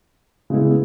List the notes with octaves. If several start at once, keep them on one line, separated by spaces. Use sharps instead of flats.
C#3 G#3 B3 E4